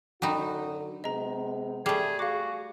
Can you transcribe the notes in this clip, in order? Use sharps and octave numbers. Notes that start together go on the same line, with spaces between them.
F#2 D3 F#3 D#4 F#4 G5 B5
C3 G#3 B3 D#5 A#5
G3 A3 G#4 C7 F#7
F#4 G#4 F5 D6